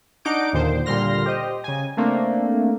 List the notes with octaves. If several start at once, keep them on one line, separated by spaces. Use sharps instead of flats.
D4 D#4 F#5 D6 G6 D7
D#2 A#2 D3 D#3 C5
A#2 D3 G3 C6 F6 A#6
G4 C5 D#5
C#3 G#5
A3 A#3 C4 D4